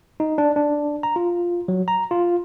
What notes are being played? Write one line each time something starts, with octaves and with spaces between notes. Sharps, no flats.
D#4
D4
D4
A#5
F4
F#3
A#5
F4